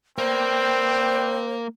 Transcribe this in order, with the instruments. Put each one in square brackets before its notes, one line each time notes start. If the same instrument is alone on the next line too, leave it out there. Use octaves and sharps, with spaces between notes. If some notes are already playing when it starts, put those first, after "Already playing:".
[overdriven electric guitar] A#3 [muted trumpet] C4 [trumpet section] B4 D5 G5 [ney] C5